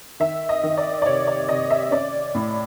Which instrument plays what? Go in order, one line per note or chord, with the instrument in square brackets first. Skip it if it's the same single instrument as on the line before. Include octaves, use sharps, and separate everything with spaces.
[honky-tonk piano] D#3 E5
D#5
D#3
D5
D5
C3 C#5
D5
C3 D#5
E5
C#4 D5
A2